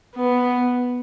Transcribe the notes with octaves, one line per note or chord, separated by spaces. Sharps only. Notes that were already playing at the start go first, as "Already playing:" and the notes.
B3